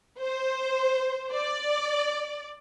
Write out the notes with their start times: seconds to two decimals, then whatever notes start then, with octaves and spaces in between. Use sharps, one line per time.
0.21 C5
1.33 D5